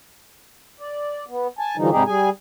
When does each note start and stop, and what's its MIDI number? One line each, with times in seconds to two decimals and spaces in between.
0.80 1.25 74
1.29 1.47 59
1.59 1.76 80
1.59 1.76 81
1.77 1.90 50
1.77 1.90 52
1.77 1.90 53
1.77 1.90 55
1.77 1.90 63
1.90 2.03 44
1.90 2.03 48
1.90 2.03 55
1.90 2.03 63
1.90 2.03 67
1.90 2.03 68
2.07 2.29 55
2.07 2.29 68
2.07 2.29 80